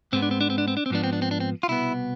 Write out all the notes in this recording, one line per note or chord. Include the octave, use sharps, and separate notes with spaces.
G#2 G#3 B3 C4
D4
C4
D4
C4
D4
C4
D4
C4
G#2 F3 B3 D4
C4
D4
C4
D4
C4
F4
C2 B2 B3 E4